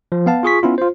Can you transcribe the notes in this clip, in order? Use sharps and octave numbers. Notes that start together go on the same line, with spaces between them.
F3
B3 F5 A5
F4 G#4 C#6 B6
B3 C#4 E4 F4
F4 C5